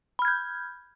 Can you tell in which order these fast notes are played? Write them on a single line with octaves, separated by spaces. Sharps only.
B5 F6 G#6 G6